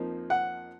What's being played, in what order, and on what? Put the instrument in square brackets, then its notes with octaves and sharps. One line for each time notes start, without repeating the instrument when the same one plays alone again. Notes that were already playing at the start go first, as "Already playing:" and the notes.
Already playing: [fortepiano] F2 F3 A#3 D#4
F#5